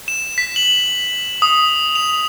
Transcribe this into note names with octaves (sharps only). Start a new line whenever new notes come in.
E7
B6
F#7
D#6
F7